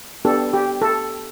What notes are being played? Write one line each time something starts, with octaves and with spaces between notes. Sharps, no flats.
B3 D4 G4 A4
G4
A4